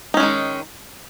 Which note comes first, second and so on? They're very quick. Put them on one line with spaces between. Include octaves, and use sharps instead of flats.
D#4 C#4 G#3 D#3